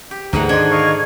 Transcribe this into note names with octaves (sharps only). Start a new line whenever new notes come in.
G4
D2 G#2 D3 E3 F#5 A#5
D#3 D4 C5 D5 D#5 G#6
D#5 F5 C#6